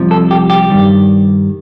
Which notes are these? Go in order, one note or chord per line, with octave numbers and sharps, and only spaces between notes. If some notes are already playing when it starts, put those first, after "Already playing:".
Already playing: C2 C3 F3
A4
G4
G4
G2 D#3 G3